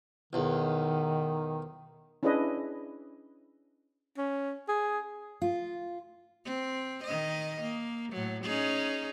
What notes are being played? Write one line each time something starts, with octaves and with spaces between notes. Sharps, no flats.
B1 E2 D#3
C#4 D4 E4 G#4 B4 D#5
C#4
G#4
F4
C4
D#3 D#5
A#3
A2 F#3
C#4 D#4 G#4